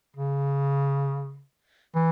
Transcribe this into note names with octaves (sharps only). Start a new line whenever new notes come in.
C#3
E3